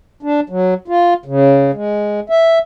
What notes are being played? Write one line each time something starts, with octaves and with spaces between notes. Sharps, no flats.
D4
F#3
F4
C#3
G#3
E5